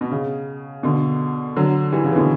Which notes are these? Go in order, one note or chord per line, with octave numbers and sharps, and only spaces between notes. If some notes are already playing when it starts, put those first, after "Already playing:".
B2
C#3
B2 D3
D3 F#3
E3 G3
C#3
E3
B2 D3